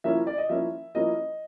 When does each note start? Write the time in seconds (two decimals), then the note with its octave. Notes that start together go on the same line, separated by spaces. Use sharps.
0.04 F3 A#3 C#4 E4 E5
0.27 D5
0.38 D#5
0.49 F3 A#3 C#4 E4 E5
0.95 F3 A#3 C#4 E4 D#5